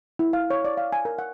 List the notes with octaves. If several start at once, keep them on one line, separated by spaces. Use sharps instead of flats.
E4
F5
C#5
D5
F5
G#5
A#4
F#5